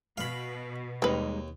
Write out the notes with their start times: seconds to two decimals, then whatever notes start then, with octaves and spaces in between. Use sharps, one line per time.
0.18 B2 F5 B5
1.02 D#2 G3 G#3 C4 D#4 B4